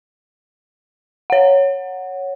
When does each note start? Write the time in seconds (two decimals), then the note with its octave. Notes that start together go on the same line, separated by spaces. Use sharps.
1.30 C#5 F#5